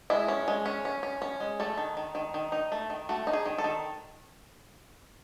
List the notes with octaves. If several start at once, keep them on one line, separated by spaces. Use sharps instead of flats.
G#3 E4
C#4
G#3
C#4
C#4
C#4
C#4
G#3
A3 A4
D#3
D#3
D#3
D#3
D#4
A3
D#3
A3 F#4
D#4
G#4
D#3
A4
D#3